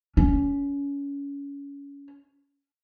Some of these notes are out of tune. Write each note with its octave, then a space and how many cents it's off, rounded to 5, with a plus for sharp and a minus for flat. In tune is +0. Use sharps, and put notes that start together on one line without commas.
C#4 +25